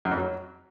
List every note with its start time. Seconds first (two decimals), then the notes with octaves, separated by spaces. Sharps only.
0.05 F#2
0.11 F2
0.17 F#3